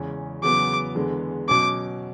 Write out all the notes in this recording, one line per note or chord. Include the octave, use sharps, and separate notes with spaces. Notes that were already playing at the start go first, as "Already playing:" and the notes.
Already playing: E2 C#3 G#3 C#4
E2 C#3 F#3 B3 D6
E2 D3 G#3 B3
B2 F#3 C#4 D6